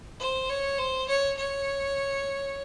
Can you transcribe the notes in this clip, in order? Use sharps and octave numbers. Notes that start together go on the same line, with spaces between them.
C5
C#5
C5
C#5
C#5